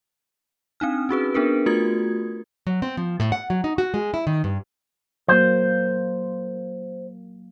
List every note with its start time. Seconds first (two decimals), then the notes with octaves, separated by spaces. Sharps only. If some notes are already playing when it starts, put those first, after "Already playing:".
0.80 C4 D4 D#4 F6
1.09 C#4 F#4 G#4 B4
1.34 B3 D4 G#4 A#4 B4
1.66 A3 F4 F#4 A#4 D#6 G#6
2.67 F#3
2.82 C4
2.97 F3
3.20 A2
3.32 F#5
3.50 F#3
3.64 D#4
3.78 F#4
3.94 G#3
4.14 E4
4.27 D#3
4.44 G2
5.28 F#3 A#3 C5